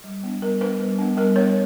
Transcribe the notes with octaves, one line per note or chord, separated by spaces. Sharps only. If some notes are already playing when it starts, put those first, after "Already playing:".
G3
B3 D4
G3 A#4
B3 D4 B4
G3
B3 D4
G3 A#4
B3 D4 C#5